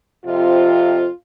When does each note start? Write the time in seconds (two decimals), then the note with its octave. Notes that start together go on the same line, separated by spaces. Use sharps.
0.25 F2 C3 F3 F4